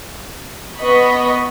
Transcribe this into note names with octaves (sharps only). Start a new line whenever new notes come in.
B3 D#5 B5 C#6